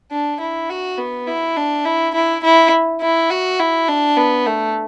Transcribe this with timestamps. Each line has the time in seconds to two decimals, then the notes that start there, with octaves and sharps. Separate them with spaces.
0.12 D4
0.40 E4
0.70 F#4
0.98 B3
1.27 E4
1.57 D4
1.85 E4
2.14 E4
2.43 E4
3.01 E4
3.30 F#4
3.60 E4
3.88 D4
4.17 B3
4.46 A3